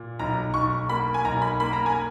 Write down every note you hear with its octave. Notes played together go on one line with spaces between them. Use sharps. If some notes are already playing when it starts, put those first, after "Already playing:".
Already playing: A#2
B1 A#5
B1 C#6
A#3 B5
G#5
B1 A#5
B5
A#3 B5
A#5
G#5